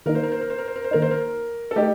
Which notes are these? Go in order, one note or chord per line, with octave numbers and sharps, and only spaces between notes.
D#3 A#3 D#4 A#4
C5
A#4
C5
A#4
C5
A#4
C5
A#4
C5
D#3 A#3 D#4 A#4
C5
A#4
A4
A3 D#4 G4